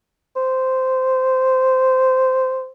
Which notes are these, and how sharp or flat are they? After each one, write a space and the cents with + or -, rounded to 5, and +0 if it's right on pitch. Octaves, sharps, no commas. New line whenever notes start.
C5 -10